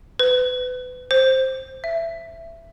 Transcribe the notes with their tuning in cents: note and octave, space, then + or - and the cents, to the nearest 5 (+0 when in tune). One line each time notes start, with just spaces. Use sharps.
B4 +30
C5 +10
E5 +15